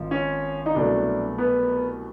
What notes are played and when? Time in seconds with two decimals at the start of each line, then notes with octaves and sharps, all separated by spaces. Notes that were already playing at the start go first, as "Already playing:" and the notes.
Already playing: G#1 G#2 F3
0.11 C#4
0.66 D#4
0.74 C2 B2 F#3 A3 D4
1.38 B3